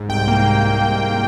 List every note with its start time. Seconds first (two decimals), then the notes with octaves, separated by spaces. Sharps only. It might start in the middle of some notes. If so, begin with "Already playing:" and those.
Already playing: G#2
0.09 C2 G5
0.28 A#3
0.46 A#3